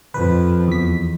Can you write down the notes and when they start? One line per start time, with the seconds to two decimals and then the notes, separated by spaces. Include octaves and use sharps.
0.14 F2 B4
0.68 E2 B6